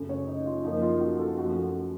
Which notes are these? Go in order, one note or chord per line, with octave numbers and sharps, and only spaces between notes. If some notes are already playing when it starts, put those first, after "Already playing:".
Already playing: F#2 C#3 A3
C#5
D#4
F4
F#2 F3 A#3 D#4
F4
F#4
A4
F#2 F3 A3 F#4